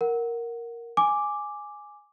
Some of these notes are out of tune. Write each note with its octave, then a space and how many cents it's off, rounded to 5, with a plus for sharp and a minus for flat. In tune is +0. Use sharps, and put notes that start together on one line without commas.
A#4 +0 F#5 +0
G#5 +0 D6 +0